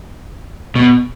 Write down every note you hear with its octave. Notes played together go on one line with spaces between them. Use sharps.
B2